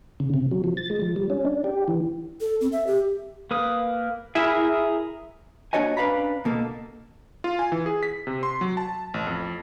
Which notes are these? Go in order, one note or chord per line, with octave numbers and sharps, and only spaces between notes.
C#3
C3
F#3
F3
A6
G#3
F3
G3
C#4
D4
G4
E3
A4
C4
E5
G4
A#3 B4 D#6
E4 G#4 A#4 E5
A#3 D4 F#4 C#5 D#5 G#5
C#4 D4 B4 F5 A#5 B5
B2 A#3 A4
F4
G#5
E3
G#4
B6
C3
C6
F#3
A5
A1
F2